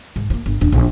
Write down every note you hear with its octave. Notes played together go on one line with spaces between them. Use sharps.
G#2
F3 A#3
G1
D#1 D4
A#1